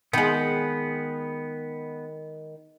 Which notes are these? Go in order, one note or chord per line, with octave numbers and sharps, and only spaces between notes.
D#3 G#3 B3